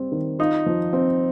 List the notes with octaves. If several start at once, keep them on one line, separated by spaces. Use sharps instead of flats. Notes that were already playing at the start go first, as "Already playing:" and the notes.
Already playing: G3 C4
D#3
D#4 F4
F3
C4